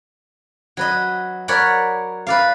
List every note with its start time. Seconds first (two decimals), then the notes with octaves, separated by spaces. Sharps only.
0.77 F#3 B4 D#5
1.48 A#4 C#5 D5 F#5 B5
2.27 B4 D5 F5